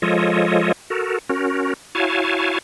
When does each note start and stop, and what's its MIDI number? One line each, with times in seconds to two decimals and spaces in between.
0.02 0.72 53
0.02 0.72 56
0.02 0.72 65
0.02 0.72 69
0.02 0.72 73
0.02 0.72 75
0.90 1.18 66
0.90 1.18 69
0.90 1.18 70
1.29 1.73 61
1.29 1.73 66
1.29 1.73 70
1.95 2.58 64
1.95 2.58 66
1.95 2.58 73
1.95 2.58 77
1.95 2.58 80
1.95 2.58 81